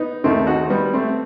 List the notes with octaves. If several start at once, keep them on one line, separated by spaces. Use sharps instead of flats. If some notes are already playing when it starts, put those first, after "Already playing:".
Already playing: B3 D#4
D#2 D#3 A3 C4
D#4 F#4
G3 B3
A3 C4